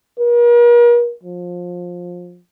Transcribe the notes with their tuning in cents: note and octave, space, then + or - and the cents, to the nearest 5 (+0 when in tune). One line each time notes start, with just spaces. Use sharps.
A#4 +40
F3 +20